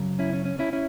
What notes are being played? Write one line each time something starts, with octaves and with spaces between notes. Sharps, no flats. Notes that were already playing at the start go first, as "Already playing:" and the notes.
Already playing: F#2 C#3 F#3
C#4 E4
C#4
C#4
C#4 E4
C#4 E4